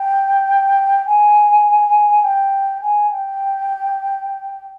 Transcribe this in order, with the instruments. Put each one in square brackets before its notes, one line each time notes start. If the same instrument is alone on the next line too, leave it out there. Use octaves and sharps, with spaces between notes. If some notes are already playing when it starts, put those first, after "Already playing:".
Already playing: [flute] G5
G#5
G5
G#5
G5